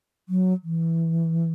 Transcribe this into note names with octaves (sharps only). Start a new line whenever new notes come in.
F#3
E3